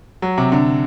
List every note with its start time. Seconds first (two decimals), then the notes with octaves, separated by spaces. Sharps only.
0.22 F#3
0.38 C3
0.52 D3